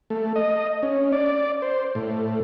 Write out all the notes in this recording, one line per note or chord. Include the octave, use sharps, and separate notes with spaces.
A3
D#5
C#4
D5
C5
A2